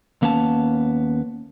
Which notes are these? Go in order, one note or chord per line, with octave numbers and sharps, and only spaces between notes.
D#2 A#3 B3 C#4 A5